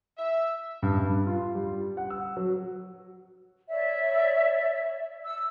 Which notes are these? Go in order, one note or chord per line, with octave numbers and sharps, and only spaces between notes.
E5
G2
G2
F4
G3
F#5
E6
F#3
C#5 D5 E5
E6